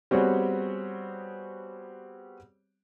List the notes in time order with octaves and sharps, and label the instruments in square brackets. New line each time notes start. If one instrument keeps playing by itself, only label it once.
[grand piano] G3 B3 C4 F#4 G#4 C#5